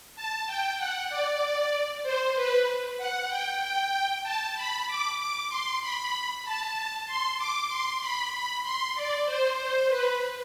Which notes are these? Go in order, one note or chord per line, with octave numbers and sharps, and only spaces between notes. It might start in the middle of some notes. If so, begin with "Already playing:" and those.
A5
G5
F#5
D5
C5
B4
F#5
G5
G5
A5
B5
D6
D6
C6
B5
A5
C6
D6
C6
B5
B5
C6
D5
C5
C5
B4